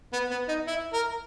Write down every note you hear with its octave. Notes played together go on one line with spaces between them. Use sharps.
B3
B3
D#4
E4
A#4